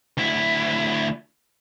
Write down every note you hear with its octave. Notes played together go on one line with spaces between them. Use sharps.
D2 E4